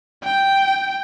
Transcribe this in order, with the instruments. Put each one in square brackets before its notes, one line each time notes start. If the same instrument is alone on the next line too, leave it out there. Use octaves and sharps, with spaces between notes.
[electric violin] G5